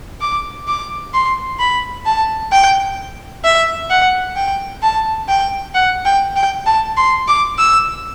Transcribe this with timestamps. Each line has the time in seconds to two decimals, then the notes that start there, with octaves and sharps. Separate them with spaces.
0.21 D6
0.67 D6
1.14 C6
1.60 B5
2.06 A5
2.52 G5
3.44 E5
3.90 F#5
4.36 G5
4.82 A5
5.28 G5
5.74 F#5
6.05 G5
6.36 G5
6.66 A5
6.97 C6
7.28 D6
7.58 E6